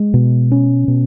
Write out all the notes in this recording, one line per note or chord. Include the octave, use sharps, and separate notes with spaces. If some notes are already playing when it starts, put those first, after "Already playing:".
Already playing: G#3
B2
C#4
B2